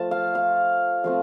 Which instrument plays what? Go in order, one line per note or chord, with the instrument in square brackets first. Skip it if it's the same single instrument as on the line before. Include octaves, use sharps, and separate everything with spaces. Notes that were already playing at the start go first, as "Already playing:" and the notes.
Already playing: [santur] F3 A3 F4 A5
F5
F5
F3 A3 C4 F5